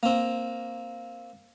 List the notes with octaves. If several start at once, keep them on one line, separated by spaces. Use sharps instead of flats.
A#3 C4